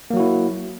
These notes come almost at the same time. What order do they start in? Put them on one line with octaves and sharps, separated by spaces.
A#3 F#3 F#4 E4